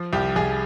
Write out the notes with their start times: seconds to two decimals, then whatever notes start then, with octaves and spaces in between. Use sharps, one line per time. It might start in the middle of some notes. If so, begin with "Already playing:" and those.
Already playing: F3
0.13 C2 G4
0.36 C2 G#4